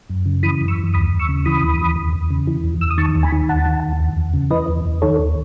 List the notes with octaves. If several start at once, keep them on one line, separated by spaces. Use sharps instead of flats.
F#2
C#3
E3 B5 D#6
F#2
C#6 E6
F#2
D#2 B5 D#6
D#2
C#6 E6
C#3
E3 B5 D#6
D#2
D#2
E2
E2
C#3
E3
E2
E2 E6
D#6
D#3 A5 C#6
D#2
G#5 B5
D#3
D#2 F#5 A5
D#3
D#2
E2
E2
C#3
E3 B4 D#5
E2
E2
D#3 A4 C#5
D#2